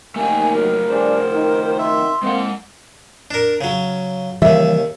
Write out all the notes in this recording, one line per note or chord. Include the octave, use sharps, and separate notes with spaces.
D#2 A3 A#3 C4 D#4 G#5
F#3 A#4
G2 D4 G#4 C5
D#3
E5 C6
G#3 A#3 C4 F#5
D4 A#4
C#3 F#3
D#2 C#3 E3 F3 G3 E5